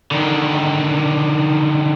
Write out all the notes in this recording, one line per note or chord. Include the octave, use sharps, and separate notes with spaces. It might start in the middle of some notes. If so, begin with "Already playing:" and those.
D3 D#3